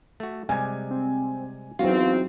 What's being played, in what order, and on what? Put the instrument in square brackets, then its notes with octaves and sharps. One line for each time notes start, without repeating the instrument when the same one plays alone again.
[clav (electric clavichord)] A3 F#4
[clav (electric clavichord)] C3 G3 G#3 [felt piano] G#5 G#6
[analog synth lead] C4
[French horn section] E2 C4 [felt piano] F#3 D#4 [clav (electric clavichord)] F4 F#4 [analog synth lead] F5